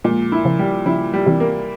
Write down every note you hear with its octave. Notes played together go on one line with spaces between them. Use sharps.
A#2 F3 G#3
E4
C#3 F3
G3
C#3 F3 E4
G3
C3 E3
A#3